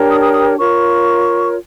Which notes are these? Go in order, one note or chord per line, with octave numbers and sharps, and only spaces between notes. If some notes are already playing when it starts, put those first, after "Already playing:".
Already playing: D4 G4 A#4 C#5
D#6
D#6
D#6
F4 A#4 C#5 C#6